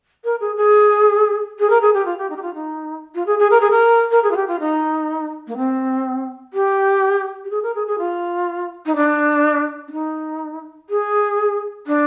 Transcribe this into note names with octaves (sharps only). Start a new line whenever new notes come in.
A#4
G#4
G#4
G#4
A#4
G#4
G4
F4
G4
D#4
G4
F4
D#4
F4
G#4
G#4
A#4
G#4
A#4
A#4
G#4
F4
G4
F4
D#4
A#3
C4
G4
G4
G#4
A#4
G#4
G#4
F4
D#4
D4
D4
D#4
G#4
D4